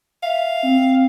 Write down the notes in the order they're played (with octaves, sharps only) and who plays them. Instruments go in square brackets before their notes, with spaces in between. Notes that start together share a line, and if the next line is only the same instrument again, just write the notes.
[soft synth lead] E5 [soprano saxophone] F5
[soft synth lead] C4